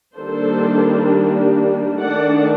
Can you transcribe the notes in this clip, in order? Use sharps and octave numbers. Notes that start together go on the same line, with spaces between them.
D#3 G3 A#3 D4 A4 C5
D#3 A3 D4 D5 F#5